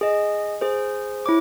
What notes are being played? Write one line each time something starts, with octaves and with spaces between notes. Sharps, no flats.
G#4 D#5
G#4 C5
E4 C#5 D6